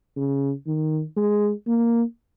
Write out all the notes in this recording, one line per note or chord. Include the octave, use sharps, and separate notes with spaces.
C#3
D#3
G#3
A#3